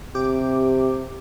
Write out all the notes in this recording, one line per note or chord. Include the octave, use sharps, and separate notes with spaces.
C3 G4 D6